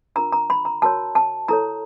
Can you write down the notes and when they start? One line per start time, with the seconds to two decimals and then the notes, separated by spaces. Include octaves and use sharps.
0.16 D4 F4 A#4 A#5
0.33 A#5
0.50 B5
0.65 A#5
0.82 F#4 A#4 C#5 A5
1.15 A5
1.48 E4 A4 C#5 A#5